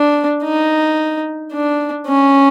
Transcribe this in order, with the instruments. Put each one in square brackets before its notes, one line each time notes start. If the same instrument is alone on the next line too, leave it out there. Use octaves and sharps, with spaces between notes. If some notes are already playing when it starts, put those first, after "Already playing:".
Already playing: [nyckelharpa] D4
D#4
D4
C#4